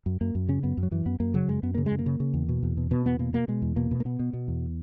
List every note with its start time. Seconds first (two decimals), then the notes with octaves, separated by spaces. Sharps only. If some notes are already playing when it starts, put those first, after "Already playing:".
0.06 F#2
0.21 F#2 A#3
0.35 F#2
0.48 C#3 C#4
0.63 F#2 B3
0.77 F#2
0.83 F#3
0.91 F#2 E3
1.06 F#2 B3
1.20 F#2 A#3
1.34 C#3 F#3
1.48 F#2 G#3
1.63 F#2 B3
1.75 C#3 A#3
1.86 G#3
1.91 F#2
1.99 A#3
2.06 C#3
2.20 C#3
2.34 E2
2.49 B2
2.63 E2
2.77 B2
2.91 B2 B3
3.05 E2 B3
3.19 B2 A#3
3.33 B2 A#3
3.48 B2 G#3
3.62 E2
3.76 B2 A#3
3.91 B2
4.00 A#3
4.05 B2 B3
4.19 B2
4.33 B2
4.48 E2